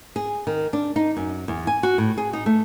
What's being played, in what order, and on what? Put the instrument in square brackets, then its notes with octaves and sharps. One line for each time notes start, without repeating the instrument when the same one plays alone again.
[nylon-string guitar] G#4
D#3
D4
D#4
F#2
E2
G#5
F#4
A2
G#4
D#4
A3